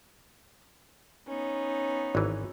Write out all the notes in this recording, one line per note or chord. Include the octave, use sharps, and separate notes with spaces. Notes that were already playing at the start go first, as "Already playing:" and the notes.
B3 C#4 D#4
G#1 E3